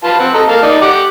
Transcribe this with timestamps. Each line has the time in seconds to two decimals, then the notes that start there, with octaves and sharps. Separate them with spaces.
0.04 F4 B4 A5
0.20 C4 F#5
0.34 A4 D#5 A#5
0.48 A#3 F5 A5
0.62 D#4 D5
0.82 G4 F#5 D6